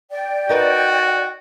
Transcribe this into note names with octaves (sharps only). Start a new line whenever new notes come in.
D5 G5
D#4 F#4 A#4 B4